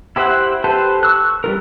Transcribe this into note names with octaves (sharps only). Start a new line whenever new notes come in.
E4 G4 C5 E5 F#5
G4 A4 B4 C5
C#6 E6 F#6
G3 F4 A#4